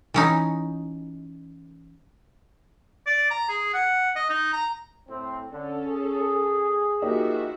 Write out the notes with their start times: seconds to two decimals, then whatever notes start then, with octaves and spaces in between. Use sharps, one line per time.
0.14 E3 C#4 D#4
3.07 D5
3.31 A#5
3.49 G#4
3.74 F#5
4.16 D#5
4.30 D#4
4.53 A#5
5.08 A2 C4
5.51 D3 C#4 A4
5.86 G#4
7.02 F3 A#3 D#4 F#4 G4 E5